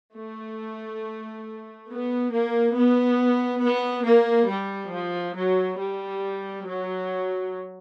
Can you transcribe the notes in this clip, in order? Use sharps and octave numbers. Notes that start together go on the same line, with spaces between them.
A3
B3
A#3
B3
B3
A#3
G3
F3
F#3
G3
F#3